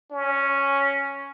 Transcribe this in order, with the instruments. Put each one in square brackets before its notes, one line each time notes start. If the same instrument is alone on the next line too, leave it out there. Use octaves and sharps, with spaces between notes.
[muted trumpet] C#4